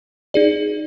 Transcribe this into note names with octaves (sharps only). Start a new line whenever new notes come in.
D#4 G#4 D5